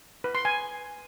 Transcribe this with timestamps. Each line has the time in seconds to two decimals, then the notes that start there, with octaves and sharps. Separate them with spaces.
0.24 B4
0.35 C6
0.45 G#5